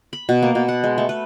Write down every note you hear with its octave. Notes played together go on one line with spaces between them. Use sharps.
B5
B2
A#3
B2
F#5
G#3
A3
B4